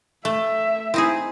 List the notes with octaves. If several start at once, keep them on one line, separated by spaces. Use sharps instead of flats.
A3 E5
C4 D#4 E4 G#4